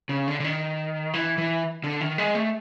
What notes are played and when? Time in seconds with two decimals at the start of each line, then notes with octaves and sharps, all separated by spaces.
0.09 C#3
0.28 D3
0.40 D3
0.44 D#3
1.14 E3
1.38 E3
1.84 D3
2.01 D#3
2.18 G#3
2.35 A3